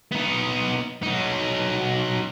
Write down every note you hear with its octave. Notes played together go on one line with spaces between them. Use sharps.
B3 D#4
F#3 D#4